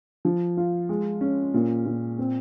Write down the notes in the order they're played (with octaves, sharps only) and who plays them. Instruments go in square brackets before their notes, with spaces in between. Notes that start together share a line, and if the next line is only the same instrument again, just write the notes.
[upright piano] F3
F4
G#3
C#4
A#2
A#2
C4